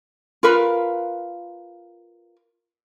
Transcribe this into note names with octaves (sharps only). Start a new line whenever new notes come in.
F4 A#4 B4 F5